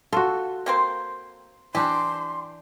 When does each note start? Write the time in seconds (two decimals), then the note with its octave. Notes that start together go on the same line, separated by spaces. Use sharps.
0.13 F4 F#4 A4
0.66 A#3 C4 C5
1.75 E3 D4 G4 C6